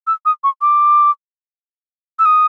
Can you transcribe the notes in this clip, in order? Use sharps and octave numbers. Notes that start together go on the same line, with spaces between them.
E6
D#6
C#6
D6
E6
D#6